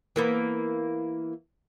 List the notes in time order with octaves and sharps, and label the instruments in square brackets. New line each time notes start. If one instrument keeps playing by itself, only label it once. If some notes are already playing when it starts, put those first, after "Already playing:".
[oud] E3 A#3 B3